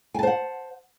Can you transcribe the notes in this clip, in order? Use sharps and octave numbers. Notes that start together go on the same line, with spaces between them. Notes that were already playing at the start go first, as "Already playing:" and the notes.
C5 F#5 G#5 A5